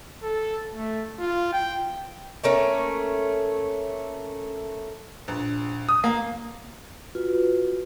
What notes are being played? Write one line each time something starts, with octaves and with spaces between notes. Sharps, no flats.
A4
A3
F4
G5
A3 A#3 C#4
A#1
D#6
A#3
F4 F#4 B4